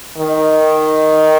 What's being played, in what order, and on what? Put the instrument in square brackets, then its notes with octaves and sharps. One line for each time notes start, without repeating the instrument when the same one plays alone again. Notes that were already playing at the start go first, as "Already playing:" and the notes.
[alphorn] D#3